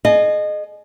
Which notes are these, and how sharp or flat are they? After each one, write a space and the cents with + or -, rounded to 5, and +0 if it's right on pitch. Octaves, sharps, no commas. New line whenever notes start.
G#4 +25 D#5 -25